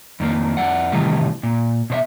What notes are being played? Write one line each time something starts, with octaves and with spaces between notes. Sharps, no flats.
F2 D#3 A#3
F2 D5 F#5
A2 C3 D#3 E3 G3 A3
A#2
B2 C5 E5